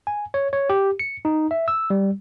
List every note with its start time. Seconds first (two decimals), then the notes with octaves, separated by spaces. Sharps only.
0.07 G#5
0.34 C#5
0.53 C#5
0.70 G4
0.99 C#7
1.25 D#4
1.51 E5
1.68 E6
1.90 G3